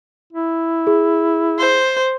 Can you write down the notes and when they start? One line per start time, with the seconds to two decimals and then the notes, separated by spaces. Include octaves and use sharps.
0.33 E4
0.87 G#4
1.59 C5